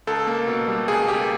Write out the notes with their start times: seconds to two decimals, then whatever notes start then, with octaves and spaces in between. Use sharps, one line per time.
0.07 C#2 A4
0.27 A#3
0.47 B2
0.68 G3
0.88 C#2 G#4
1.08 A#3 G4